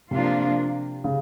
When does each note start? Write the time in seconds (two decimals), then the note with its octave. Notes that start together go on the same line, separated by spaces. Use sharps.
0.11 C3 F3 A#3 D4 F4
1.04 C#3